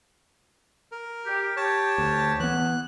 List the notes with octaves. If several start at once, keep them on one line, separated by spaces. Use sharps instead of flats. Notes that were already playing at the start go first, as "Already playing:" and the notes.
A#4
G4
G4 C#5 A5
D2
E3 B3 F#6